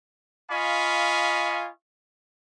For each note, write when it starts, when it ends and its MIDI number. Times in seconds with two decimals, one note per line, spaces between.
0.51 1.70 65
0.51 1.70 75
0.51 1.70 77
0.51 1.70 80
0.51 1.70 83
0.51 1.70 85